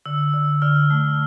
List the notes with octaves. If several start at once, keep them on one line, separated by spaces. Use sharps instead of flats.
D3 E6
D3
D3 F6
A3